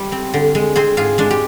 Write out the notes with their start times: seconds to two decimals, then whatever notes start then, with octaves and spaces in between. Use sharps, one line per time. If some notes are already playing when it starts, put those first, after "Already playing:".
Already playing: G3
0.12 C4
0.34 D3
0.55 G#3
0.76 C4 G#4 C5
0.97 G#2 F4 G#4
1.18 G#3 D4
1.31 G4